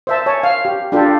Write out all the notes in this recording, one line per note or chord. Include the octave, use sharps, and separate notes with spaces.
C5 E5 A5
C#5 G#5 A5
F5
G4
D4 F4 G4 A4